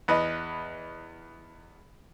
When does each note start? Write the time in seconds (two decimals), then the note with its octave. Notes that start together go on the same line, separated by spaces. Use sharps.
0.08 E2 B4 D#5